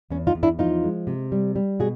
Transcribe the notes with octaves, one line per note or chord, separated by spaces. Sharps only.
E2 C#4
D#4 F4
E2
D4 E4
F3 D#4 F4
G#3
C3
G3
G3
B2 F#4 G#4